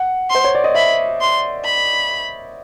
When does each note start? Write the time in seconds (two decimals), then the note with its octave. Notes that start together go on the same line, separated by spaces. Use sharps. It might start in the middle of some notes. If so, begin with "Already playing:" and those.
Already playing: F#5
0.30 C5 C6
0.44 C#5
0.55 D5
0.64 D#5
0.74 E5 B5
1.21 C6
1.65 B5